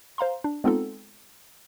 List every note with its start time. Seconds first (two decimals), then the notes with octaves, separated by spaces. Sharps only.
0.18 C5 F5 A#5 C6
0.44 D4
0.64 G#3 B3 C4 D#4 F4 A4